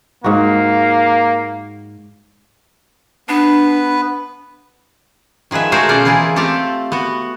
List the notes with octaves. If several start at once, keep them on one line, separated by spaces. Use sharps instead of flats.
G#2 A#3 F#4
B3 D4 B4
D#3 F3 G#4 B4 E5
A3 F#4 G#4 A#4 C5
B2 C#4 F4 C5 D5
E3 E4 F4 G#4 A#4
A3 C4 F4 G4 A4
B3 F#4